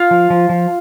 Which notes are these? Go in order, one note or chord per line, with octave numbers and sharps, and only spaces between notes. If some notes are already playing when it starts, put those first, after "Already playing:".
Already playing: F4 F5
F3
F3
F3